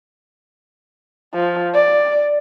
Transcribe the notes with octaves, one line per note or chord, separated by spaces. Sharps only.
F3
D5